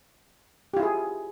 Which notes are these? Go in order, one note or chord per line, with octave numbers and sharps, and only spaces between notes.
E4 F4 G4 G#4